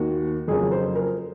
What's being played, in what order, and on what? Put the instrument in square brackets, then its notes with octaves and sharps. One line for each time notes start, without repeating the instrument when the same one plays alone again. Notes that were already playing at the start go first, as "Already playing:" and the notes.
Already playing: [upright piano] D#2 D#3 A#3 F#4
F2 C#3 F#3 A#3 G#4
C5
A#4